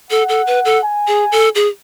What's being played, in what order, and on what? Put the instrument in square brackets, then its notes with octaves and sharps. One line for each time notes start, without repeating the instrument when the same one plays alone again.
[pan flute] A4 [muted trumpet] F#5
[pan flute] A4
B4
A4
[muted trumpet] G#5
[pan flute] G#4
A4
G#4